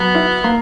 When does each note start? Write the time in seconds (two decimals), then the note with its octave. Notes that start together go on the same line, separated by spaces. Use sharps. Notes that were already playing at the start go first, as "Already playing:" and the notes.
Already playing: F#3 B3
0.15 E4
0.44 A#3